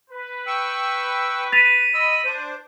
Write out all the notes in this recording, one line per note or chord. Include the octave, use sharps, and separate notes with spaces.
B4
G5 C#6 E6
A6 B6 D#7 F7
D#5 B5 E6
D4 C5